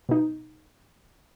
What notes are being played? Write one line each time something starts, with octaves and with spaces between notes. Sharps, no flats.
B2 D#4